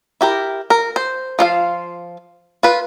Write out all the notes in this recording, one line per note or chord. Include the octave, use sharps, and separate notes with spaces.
E4 G4 A#4
A#4
C5
F3 F4 F5
F4 B4